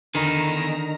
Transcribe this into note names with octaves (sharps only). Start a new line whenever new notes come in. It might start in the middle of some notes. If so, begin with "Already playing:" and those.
E2 D3 D#3 A#5